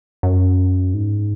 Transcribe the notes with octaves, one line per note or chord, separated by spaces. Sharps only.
F#2
G#2